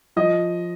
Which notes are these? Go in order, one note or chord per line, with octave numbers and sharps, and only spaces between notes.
F3 D#5